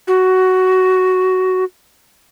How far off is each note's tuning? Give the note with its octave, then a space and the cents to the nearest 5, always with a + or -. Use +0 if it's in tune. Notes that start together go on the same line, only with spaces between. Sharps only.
F#4 +10